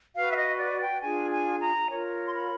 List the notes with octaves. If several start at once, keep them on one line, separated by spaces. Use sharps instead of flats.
F#4 B4 F5
E5
D#5
D5
G5
D4 F4 G#4 G#5
G#5
A#5
F4 A#4 C#5
C6
B5